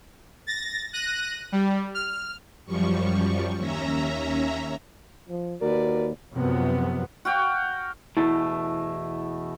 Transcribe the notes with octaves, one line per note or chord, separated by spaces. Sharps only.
A6 A#6
F#6 A#6 D#7
G3
F6
F#2 F3 G3 C#6
D#2 C#4 E5 A#5
F3
D#2 F#4 A#4 B4 D5
F#2 C3 F3 F#3 B3
F#4 F5 G5
E2 B2 A3 E4